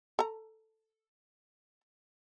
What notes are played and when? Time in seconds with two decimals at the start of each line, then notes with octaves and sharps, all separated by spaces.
0.19 A4 A#5